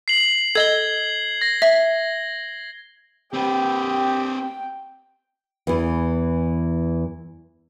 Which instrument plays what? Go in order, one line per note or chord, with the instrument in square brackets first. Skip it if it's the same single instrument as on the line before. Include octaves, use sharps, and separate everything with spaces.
[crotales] C7 F#7
[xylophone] A4 D#5 [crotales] G#6 G7
[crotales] A#6
[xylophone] E5
[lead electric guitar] C4 B4 [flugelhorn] G4 [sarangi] G5
[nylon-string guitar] E2 E3